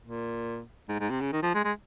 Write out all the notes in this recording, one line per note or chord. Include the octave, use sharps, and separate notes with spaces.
A#2
G#2
G#2
C3
C#3
D#3
F3
G#3
G#3